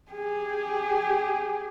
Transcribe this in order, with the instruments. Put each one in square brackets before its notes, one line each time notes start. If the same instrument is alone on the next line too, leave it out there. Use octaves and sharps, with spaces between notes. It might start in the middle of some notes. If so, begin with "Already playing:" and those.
[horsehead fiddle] G4 G#4